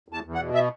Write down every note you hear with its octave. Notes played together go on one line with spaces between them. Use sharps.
E2 A5
E2
F#5
B2
E5